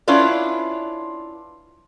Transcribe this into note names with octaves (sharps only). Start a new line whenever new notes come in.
C#4 D4 E4 F4 B4 D5